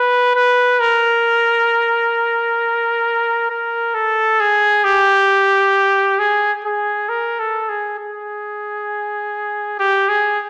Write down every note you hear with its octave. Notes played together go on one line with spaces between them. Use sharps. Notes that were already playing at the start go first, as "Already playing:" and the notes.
Already playing: B4
B4
A#4
A#4
A4
G#4
G4
G#4
G#4
A#4
A4
G#4
G#4
G4
G#4